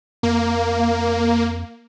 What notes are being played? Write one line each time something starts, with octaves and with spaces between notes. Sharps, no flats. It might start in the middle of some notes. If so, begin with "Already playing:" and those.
F2 A#3